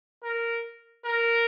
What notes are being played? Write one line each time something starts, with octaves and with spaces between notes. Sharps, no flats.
A#4
A#4